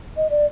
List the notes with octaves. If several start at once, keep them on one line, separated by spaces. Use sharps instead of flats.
D#5
D5